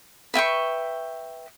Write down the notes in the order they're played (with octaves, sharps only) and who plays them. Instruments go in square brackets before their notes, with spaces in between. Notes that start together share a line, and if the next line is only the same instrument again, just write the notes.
[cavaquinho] B4 E5 G5 C#6